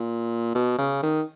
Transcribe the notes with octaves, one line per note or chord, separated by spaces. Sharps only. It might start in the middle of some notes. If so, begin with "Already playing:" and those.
Already playing: A#2
B2
C#3
D#3